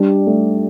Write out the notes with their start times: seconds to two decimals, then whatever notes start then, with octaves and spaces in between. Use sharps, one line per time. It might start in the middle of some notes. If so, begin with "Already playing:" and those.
Already playing: G3 D4
0.27 A3